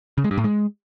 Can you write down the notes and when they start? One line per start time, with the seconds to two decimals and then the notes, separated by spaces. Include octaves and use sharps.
0.18 C#3
0.24 G#3
0.31 G2
0.38 A2
0.44 G#3